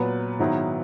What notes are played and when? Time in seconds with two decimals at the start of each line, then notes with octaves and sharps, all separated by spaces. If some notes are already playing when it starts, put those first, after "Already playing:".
Already playing: A#2 F#3 B3 B4
0.39 G#2 D#3 F#3 B3 E4